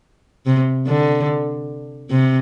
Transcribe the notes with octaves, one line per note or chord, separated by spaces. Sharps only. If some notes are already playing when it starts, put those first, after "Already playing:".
C3
D3
C3